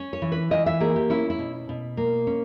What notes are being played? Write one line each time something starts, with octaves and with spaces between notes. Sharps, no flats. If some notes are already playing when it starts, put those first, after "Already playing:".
Already playing: C#4
C#5
E3
B4
E3 D#5
E5
A#3 G#4
G4
C#4 E4
E4
B2
B2
A#3
C#4